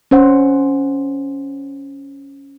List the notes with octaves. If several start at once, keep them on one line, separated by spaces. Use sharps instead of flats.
C#4 C5 F#5